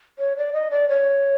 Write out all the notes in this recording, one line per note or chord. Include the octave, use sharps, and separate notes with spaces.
C#5
D5
D#5
D5
C#5